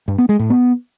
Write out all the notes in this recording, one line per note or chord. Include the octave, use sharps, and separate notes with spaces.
G2
B3
G#3
A2
B3